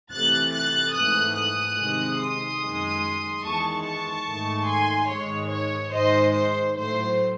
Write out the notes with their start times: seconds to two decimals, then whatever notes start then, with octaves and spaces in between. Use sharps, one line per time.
0.11 C3 E3 A3 F#6 A6
0.53 F#6 A6
0.94 G#2 E3 A3 D#6 F#6
1.36 D#6 F#6
1.77 C3 D#3 G#3
2.19 C6 D#6
2.61 F#2 D#3 G#3
3.43 E2 D#3 G#3 A5 C#6
3.85 A5 C#6
4.27 G#2 D#3 A3
4.68 G#5 C6
5.10 G#2 D#3 G#3 C#5
5.52 C#5
5.93 G#2 D#3 G#3 C5 D#5
6.34 C5
6.76 A2 F#3 A3 C5